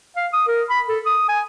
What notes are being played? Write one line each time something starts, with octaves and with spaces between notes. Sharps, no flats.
F5
D#6
A#4
B5
A4
D#6
G#5